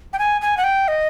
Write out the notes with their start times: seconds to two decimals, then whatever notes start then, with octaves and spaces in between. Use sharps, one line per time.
0.13 G5
0.19 G#5
0.41 G#5
0.57 F#5
0.64 G5
0.88 D#5